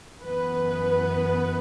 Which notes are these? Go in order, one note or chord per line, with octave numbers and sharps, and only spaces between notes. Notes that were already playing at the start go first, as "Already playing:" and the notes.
F#2 E3 B3 B4